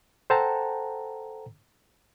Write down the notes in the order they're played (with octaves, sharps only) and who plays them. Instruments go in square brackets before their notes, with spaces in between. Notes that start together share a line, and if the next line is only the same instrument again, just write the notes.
[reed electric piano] A4 C5 F#5 G5 A5 A#5